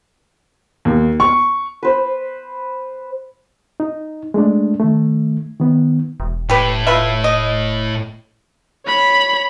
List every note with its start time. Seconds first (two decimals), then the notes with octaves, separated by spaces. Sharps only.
0.85 D#2
1.20 C#6
1.83 B4 C5
3.80 D#4
4.34 G#3 A3 D4
4.80 D#3 A3
5.60 D#3 B3
6.20 E1
6.49 A2 G4 B4
6.87 F4 B4 E5
7.24 D#5
8.86 C#5 B5